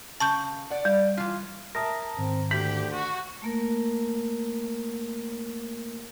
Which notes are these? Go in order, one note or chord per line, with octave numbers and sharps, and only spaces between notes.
C#3 A5 C#6 G6
D5 F#5
G3
E3 F4
A#4 E5 A5 D#6 A#6
G#2 D#3 C4
D2 G4 G6 B6 F#7
F#4
A3 A#3 A#4